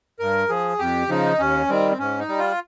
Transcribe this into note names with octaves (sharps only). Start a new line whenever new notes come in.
G2 A#4
F3 G#4
F2 G4
C#3 F3 D#4
D#2 C#4
D#3 G3 C4
C4
G#2 C#4
D#4
G3
F4